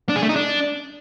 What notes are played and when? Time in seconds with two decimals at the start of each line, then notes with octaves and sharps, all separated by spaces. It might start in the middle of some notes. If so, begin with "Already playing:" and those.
0.09 D4
0.16 G#4
0.23 A3
0.29 D#4
0.36 D4